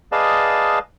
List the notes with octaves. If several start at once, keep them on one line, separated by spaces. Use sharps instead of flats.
G#4 B4 D5 D#5 F5 A5